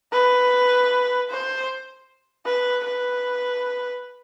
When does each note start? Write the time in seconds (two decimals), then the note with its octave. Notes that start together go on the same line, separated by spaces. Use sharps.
0.13 B4
1.30 C5
2.46 B4
2.85 B4